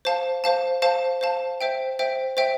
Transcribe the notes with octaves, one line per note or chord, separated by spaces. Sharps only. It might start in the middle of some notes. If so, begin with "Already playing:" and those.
C5 F5 A5
C5 F5 A5
C5 F5 A5
C5 F5 A5
C5 E5 G5
C5 E5 G5
C5 E5 G5